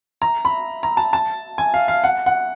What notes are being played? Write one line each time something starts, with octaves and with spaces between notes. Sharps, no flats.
A#5
B5
A#5
A5
A5
G#5
F5
F5
F#5
F#5